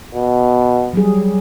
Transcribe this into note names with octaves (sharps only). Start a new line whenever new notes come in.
B2
F#3 G3 G#4